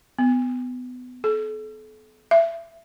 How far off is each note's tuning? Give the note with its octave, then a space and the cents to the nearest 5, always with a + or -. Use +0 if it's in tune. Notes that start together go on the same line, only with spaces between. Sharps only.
B3 +25
A4 -35
E5 +20